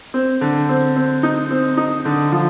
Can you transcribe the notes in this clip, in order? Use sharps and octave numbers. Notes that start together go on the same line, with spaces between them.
C4
D3
C4
C4
D#4
C4
D#4
D3
F3